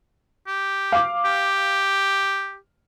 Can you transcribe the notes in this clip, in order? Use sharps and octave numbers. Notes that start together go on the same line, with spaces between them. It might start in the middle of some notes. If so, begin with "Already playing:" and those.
G4
F5 D6
G4